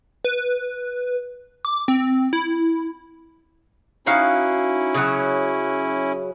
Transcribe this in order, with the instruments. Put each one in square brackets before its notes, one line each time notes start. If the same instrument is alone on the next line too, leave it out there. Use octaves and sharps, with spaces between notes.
[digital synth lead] B4
D6
C4
E4
[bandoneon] C#4 E4 [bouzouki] D#4 F#4 F5
[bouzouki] C#3 F#3